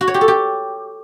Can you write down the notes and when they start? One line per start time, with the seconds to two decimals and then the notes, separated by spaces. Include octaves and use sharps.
0.01 F#4
0.07 C#5
0.14 G4
0.21 A4
0.28 G4